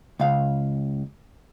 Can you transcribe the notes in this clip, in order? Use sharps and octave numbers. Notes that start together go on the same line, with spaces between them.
C#2 F5